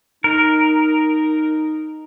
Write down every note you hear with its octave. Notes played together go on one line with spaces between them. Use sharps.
D#4 A#4